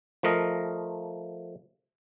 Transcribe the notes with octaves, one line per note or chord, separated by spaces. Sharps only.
F3 A3 A#4 D#5